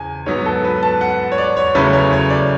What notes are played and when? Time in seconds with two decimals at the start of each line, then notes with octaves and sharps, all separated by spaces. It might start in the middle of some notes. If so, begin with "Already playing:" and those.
Already playing: E2 C#3 G#5
0.26 G#2 F#3 B3 C#5
0.46 A4
0.64 B4
0.83 A5
1.01 F#5
1.32 C#5
1.38 D5
1.57 C#5
1.75 E2 C#3 F#3 A3 C#4 B4
1.93 C#5
2.13 C#5
2.30 D5